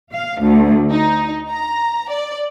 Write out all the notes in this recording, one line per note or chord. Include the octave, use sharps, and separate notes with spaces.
F5
D2
D#4
A#5
D5